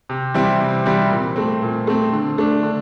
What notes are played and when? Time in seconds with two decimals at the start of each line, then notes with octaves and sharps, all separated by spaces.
0.09 C3
0.34 E3 G3 C4 E4
0.61 C3
0.85 E3 G3 C4 E4
1.10 A#2
1.36 A3 C4
1.62 A#2
1.87 A3 C4
2.13 D3
2.38 A3 D4
2.63 D3